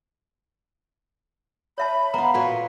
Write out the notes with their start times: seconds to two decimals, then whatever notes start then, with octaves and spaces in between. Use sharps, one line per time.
1.78 C#5 E5 A5 B5
2.14 B3 F4 A#5
2.34 A#2 F#4 B4 G#5